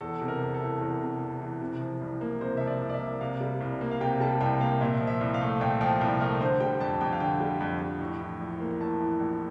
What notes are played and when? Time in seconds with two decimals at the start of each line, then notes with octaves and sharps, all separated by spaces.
0.01 E2 A4
0.21 C3
0.28 A#4
0.41 E1
0.54 A4
0.61 E3
0.81 E2 A#4
1.01 C3
1.21 E1
1.41 E3
1.61 C3
1.81 F3
2.01 C2
2.21 A#3
2.41 C3 C5
2.57 F3 E5
2.67 D5
2.81 C2
2.89 D5
2.94 E5
3.00 A#3
3.21 C3 F5
3.41 G3
3.61 C2
3.81 A#3
3.91 F5
4.01 C3 G5
4.21 G3 A5
4.41 C2 G5
4.60 A#3 F5
4.81 A#2 E5
5.01 F3
5.07 E5
5.21 C2
5.34 F5
5.41 A3
5.61 A#2 G5
5.81 F3 G5
6.01 C2
6.21 A3 A#4
6.41 D3 C5
6.60 G3 G5
6.81 F2 A5
7.01 F2 G5
7.13 F5
7.20 D3 G5
7.41 G3
7.60 F2
7.81 F2
8.00 A2
8.21 E3
8.41 A#1
8.60 A#3
8.81 A2 A5
9.01 E3
9.20 A#1